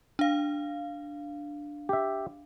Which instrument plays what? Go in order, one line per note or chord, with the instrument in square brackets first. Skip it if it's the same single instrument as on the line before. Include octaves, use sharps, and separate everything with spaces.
[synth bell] D4 F5
[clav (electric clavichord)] G4 E5